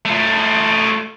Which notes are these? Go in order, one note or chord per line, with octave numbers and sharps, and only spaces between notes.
A3 F4